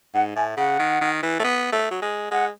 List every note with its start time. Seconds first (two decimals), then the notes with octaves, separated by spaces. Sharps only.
0.14 G#2 F#5
0.36 A2 G#5
0.57 C#3 F#5
0.80 D#3
1.01 D#3
1.22 E3
1.39 A3
1.44 B3
1.73 A3
1.91 F#3
2.02 G#3
2.31 G#3 F#5